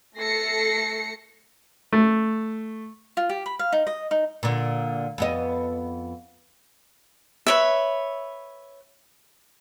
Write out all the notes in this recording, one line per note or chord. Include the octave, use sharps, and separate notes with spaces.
A3 A4 A#6 C7 C#7
A3
F4
G4
B5
F5
D#4
D#5
D#4
A#2 D3
F2 B3 D#5
B4 C#5 E5